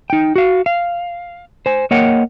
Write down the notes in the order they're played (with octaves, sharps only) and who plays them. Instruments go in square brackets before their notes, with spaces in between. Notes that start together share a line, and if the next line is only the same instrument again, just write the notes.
[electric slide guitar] D#4 G5
F#4 F5
F5
C5 G#5
A#3 A#4 C#5 D#5 F#5 G5